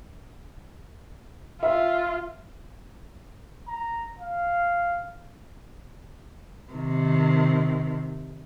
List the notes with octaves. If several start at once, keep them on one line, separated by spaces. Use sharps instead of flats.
F4 E5
A#5
F5
C3 D#3